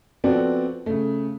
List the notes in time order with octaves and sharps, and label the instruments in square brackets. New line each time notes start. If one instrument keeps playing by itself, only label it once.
[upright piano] F3 B3 C4 F#4 A4 D5
C#3 A3